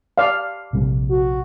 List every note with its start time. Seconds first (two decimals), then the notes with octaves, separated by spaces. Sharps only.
0.18 D5 F5
0.73 A#1 C3 G3
1.10 F#4